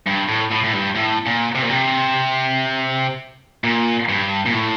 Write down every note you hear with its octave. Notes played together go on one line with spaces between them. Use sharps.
G2
A2
A2
A2
G2
A2
A#2
C3
A#2
C3
A#2
G2
A#2
A2